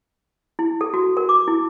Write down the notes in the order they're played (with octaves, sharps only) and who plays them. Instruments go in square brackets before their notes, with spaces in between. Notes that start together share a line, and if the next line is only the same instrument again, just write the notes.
[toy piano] E4
A4
F#4
A#4
D6
E4